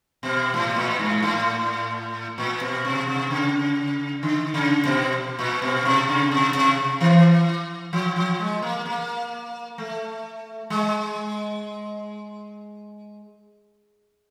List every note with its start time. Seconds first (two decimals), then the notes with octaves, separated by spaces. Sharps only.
0.23 B2
0.54 A2
0.76 A#2
0.99 G#2
1.23 A2
2.38 A#2
2.61 B2
2.85 C3
3.08 C3
3.30 C#3
4.23 D3
4.54 C#3
4.85 B2
5.39 A#2
5.62 B2
5.85 C3
6.08 C#3
6.31 C3
6.55 C3
7.01 E3
7.93 F3
8.16 F3
8.39 G#3
8.62 A#3
8.86 A#3
9.78 A3
10.70 G#3